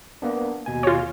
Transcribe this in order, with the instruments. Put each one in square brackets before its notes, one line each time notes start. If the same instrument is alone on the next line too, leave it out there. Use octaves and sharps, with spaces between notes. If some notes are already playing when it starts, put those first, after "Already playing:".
[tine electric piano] A#3 B3 D4
D#2 B2 G#5
[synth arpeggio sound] F4 C#5